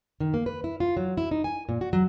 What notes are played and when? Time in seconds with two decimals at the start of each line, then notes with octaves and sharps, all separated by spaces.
0.20 D#3
0.34 A#3
0.46 B4
0.64 E4
0.80 F4
0.97 F#3
1.18 E4
1.31 D#4
1.44 G#5
1.69 A#2
1.81 F#4
1.93 F#3